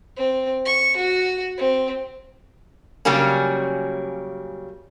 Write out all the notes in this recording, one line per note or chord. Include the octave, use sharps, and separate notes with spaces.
C4
C#6
F#4
C4
C#3 F#3 G3 A#3 C#4